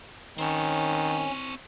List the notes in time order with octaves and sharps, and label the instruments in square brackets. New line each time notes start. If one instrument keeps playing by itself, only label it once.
[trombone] D#3 [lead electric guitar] C4 C#5 [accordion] C#4